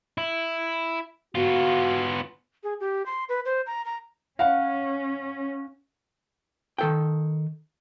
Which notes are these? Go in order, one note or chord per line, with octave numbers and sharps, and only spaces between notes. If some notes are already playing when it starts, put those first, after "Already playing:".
E4
B3 F4 F#4
G#4
G4
C6
B4
C5
A#5
A#5
C#4 F5 F#5
D#3 A4 G5